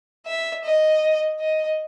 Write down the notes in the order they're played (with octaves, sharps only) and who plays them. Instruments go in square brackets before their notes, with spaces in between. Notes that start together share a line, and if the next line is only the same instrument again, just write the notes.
[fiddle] E5
D#5
D#5